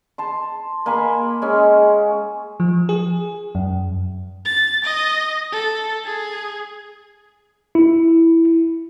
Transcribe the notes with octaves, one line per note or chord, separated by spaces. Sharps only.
A5 C6
A#3 G#5 B5 C6
G#3 C#4
F3
G#4
F#2
A6
D#5
A4
G#4
E4